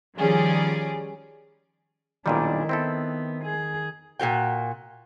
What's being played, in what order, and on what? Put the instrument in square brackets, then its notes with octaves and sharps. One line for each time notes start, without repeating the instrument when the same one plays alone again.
[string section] D#3 F3 G3 C#4 G#4 D5
[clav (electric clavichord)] B1 A#2 G3 [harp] D#3 [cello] D4 E4
[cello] B3 [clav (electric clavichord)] C4 E4 A4
[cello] G#4
[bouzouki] A#2 G#3 F#4 G5